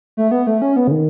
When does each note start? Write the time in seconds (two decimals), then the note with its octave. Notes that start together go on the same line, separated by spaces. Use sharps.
0.17 A3
0.31 B3
0.47 A3
0.62 C#4
0.76 B3
0.88 C#3
0.91 D#3